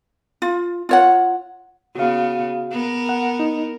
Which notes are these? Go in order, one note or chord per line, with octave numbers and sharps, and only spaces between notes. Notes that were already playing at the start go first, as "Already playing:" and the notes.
F4
F4 C#5 F#5
C#3 B3 F#4 F5
B3 A#4
F#5
D#4